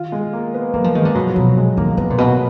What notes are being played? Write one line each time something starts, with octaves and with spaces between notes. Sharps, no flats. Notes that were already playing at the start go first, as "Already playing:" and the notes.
Already playing: D#3 F4
G#3
A#3
B3
F#3 A#3
F3
D#3 G#3
D3 G#3
B2 F#3
F3
B2 F#3
G#3
D#3 A#3
A#3
D3 B3
A#2
B2 A#3